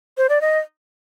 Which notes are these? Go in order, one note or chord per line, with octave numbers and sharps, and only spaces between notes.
C5
D5
D#5